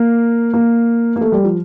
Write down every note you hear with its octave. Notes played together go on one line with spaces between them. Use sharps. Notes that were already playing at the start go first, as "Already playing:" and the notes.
Already playing: A#3
A#3
A#3
A3
G3
F3